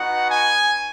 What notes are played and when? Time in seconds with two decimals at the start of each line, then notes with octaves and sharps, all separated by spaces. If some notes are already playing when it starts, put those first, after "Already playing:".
Already playing: B3 D#4 F#4 F#5
0.28 G#5